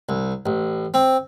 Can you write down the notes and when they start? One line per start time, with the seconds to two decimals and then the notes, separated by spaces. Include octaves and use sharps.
0.09 C2
0.46 A1
0.94 C4